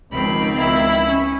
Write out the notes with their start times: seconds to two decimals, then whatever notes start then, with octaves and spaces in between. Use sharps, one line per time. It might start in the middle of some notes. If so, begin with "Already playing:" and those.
0.13 C#2 D#3 F3 C4 B5
0.57 E4
1.05 C#4